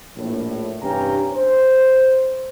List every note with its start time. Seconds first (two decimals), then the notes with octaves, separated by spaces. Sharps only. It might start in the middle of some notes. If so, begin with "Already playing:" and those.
0.17 A#1 A2
0.83 E2 G2 C3 C#4 G5 A#5
1.33 C5